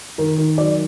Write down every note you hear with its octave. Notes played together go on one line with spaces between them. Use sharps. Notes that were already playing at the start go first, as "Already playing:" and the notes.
D#3 A#4
D#3
F#3 D5